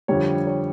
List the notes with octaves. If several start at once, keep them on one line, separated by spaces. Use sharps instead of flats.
F2 D3 G3 C#5
C#5